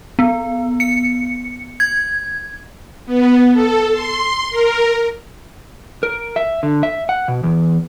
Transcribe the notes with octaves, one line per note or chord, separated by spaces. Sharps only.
B3
C#7
G#6
B3
A4
C6
A#4
A#4
E5
D3
E5
F#5
B2
E2